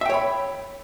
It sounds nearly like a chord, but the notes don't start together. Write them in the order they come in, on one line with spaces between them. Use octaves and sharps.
E5 G5 C#5 B5